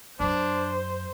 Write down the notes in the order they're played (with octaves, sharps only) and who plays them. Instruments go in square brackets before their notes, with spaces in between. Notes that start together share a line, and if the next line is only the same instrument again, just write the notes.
[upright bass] F#2 [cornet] D4 [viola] C5